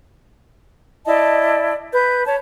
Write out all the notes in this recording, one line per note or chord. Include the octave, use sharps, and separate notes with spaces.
E4 D5 D#5 A5
B4 G6
C#5 A5